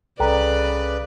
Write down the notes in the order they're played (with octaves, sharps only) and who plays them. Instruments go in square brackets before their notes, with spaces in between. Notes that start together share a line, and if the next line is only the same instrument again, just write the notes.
[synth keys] C2 [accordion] C#3 B4 [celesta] A4 G5 A#5 [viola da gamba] D5